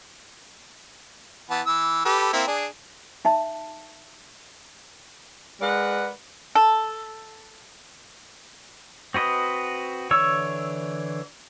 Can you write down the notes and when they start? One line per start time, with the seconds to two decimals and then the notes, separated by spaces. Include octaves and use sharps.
1.50 E3 B3 A5
1.66 E3 E6
2.05 G4 A4 B4
2.33 A#3 C4 E4
2.47 D4 G#4
3.25 D#4 E5 A5
5.61 G#3 A#4 B4 D5 F#5
6.55 A4
9.14 C4 F#4 B4 D#5
10.11 D3 E3 C#5 C#6 E6